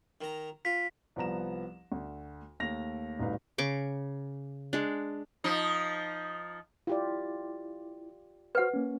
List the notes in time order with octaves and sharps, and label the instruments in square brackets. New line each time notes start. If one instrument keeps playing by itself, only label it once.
[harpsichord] D#3 A#5
[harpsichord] F4 [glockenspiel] B6
[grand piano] C2 F3 B3 A#5 E7
D2
D#2 A3 A#6 F7
D1 C2 D#4 B4 F5
[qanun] C#3 C#6 D6
G#3 D4
[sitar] F3 D#4
[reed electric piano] E4 [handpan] F4 G4 D5
[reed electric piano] F#4 C5 F6 [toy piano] B4 F#5
[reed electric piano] A#3 C#4